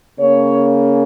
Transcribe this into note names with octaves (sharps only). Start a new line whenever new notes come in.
C#3 A#3 C#4 C#5